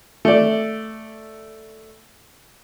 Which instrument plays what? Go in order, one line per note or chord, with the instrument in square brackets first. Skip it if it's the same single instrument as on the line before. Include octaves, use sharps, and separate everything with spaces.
[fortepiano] A3 D5